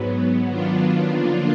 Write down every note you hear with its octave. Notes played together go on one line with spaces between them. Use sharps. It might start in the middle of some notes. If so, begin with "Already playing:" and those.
Already playing: G#2 F#3 B3
D#3 F#3 B3 D4 F4
D3 F3 A#3 D4 F4